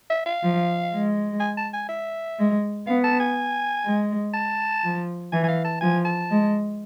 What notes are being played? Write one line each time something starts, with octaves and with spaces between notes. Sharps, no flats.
E5
F5
F3
G#3
G#5
A5
G#5
E5
G#3
B3 F5
A5
G#5
G#3
A5
F3
E3 G#5
G#5
F5
A5
F3 G#5
A5
G#3